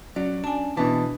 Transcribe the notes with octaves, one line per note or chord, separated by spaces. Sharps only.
F#3 C#4 D5
D4 G#5 A5
B2 E3 D4 B4 A5